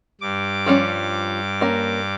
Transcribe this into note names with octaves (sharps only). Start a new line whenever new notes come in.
G2 D6
F3 G3 C#4
A#3 C#4